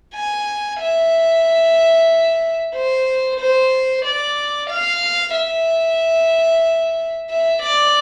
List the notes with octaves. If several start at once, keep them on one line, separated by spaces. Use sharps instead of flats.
G#5
E5
C5
C5
D5
F5
E5
E5
D5